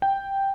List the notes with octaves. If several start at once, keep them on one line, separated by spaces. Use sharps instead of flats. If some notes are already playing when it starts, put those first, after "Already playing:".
G5